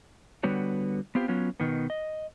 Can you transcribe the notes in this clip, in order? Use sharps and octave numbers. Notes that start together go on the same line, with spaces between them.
D3 G3 B3 F#4 C#5
B3 C4 F4 G4
F#3 B3 C#4 F4
B2 D#3 B3
D#5